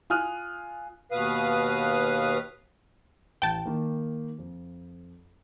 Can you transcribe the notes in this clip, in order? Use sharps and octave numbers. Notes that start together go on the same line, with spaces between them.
F4 G#5 D#6 F6 F#6 D#7
D#2 B2 B4 F5 D#6
A1 G5 A5
D#3 A#3
F2